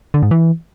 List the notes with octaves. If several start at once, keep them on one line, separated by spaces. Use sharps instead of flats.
D3
G#2
E3